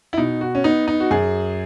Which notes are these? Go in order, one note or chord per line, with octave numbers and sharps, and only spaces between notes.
E4
B2 D#4
F#4
C#4
B3 D#4
D#4
F#4
F#2 G#4